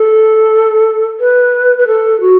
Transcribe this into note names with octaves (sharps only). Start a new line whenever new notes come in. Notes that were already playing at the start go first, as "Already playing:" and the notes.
Already playing: A4
B4
B4
A4
F#4